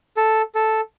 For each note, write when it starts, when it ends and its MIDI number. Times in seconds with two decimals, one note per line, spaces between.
0.17 0.42 69
0.55 0.81 69